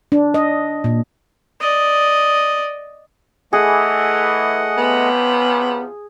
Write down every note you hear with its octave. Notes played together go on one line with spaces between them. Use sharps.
D4
D#5
A#2
D5 D#5
E3 A3 G#4 D#5 F#5
C3 F3 B3 C#4